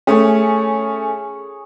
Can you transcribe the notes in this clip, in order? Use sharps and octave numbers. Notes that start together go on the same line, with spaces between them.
A3 C#4 G#4 C#5